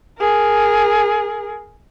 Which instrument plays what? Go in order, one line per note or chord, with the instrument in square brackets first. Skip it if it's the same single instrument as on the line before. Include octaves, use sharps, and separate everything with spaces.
[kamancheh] G#4 A#4